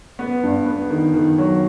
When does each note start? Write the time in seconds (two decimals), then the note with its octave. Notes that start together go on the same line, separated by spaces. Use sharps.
0.19 B3
0.43 G2
0.66 B3
0.90 D#3
1.14 D#3
1.38 F#3